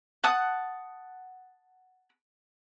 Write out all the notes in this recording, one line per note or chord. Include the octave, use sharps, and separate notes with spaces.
F#5 A5 D#6